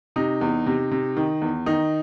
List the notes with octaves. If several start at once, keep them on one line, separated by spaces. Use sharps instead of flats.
C3 D#4
E2
C3
C3
D#3
E2
D#3 D#4